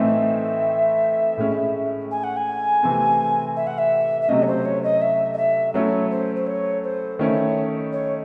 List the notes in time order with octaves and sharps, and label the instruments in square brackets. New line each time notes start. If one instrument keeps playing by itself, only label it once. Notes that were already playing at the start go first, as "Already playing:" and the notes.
Already playing: [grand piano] A2 E3 A3 C4 D#4 [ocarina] E5
[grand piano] A2 G#3 C#4 E4
[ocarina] G#5
F#5
G#5
[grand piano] C3 E3 A3 C4
[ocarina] E5
F#5
E5
E5
[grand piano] C3 F#3 A3 C#4 [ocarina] D#5
[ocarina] C#5
C5
C#5
D#5
E5
D#5
E5
[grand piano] F#3 A3 C#4 E4 [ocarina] C#5
[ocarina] C5
C5
C#5
C5
[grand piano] D#3 A3 C#4 E4 [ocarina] C#5
[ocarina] C#5